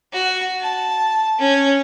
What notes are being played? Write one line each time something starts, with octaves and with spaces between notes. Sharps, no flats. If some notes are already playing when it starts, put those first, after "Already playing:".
F#4
A5
C#4